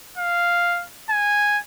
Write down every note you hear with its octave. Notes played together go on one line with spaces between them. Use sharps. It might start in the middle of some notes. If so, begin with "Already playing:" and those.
F5
G#5